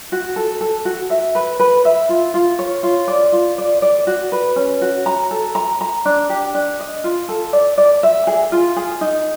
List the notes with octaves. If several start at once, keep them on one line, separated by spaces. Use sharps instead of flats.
F#4
A4
A4
F#4
E5
B4
B4
E5
F4
F4
C#5
F4
D5
F4
D5
D5
F#4
B4
C#4
F#4
A#5
A4
A#5
A#5
D4
G4
D4
D#5
F4
A4
D5
D5
E5
G#4
F4
G#4
D#4